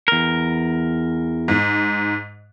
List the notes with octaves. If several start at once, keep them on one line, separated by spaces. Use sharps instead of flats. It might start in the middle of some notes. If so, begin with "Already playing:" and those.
E2 A#4
G#2